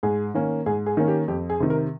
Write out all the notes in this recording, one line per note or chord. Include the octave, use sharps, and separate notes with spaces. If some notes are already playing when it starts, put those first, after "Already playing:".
G#2 G#4
D#3 A#3 C#4
G#2 G#4
G#4
D#3 A#3 C#4
G4
F2 G4
G#4
C3 D#3
A#4